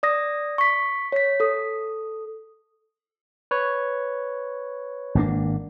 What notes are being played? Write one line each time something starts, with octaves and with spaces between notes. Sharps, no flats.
D5 D#6 A#6
C#6 B6
C#5 B6
A4 D#6
B4 C#5
G#1 A#3 D4